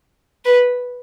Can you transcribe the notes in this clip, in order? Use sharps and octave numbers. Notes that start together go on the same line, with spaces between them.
B4